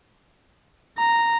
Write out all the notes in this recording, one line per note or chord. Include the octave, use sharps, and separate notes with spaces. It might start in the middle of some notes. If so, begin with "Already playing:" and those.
A#5